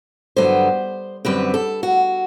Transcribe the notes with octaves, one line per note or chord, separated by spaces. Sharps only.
G2 D3 F#3 B3 C5
F#2 D3 G3 C4 B4
A4
F#4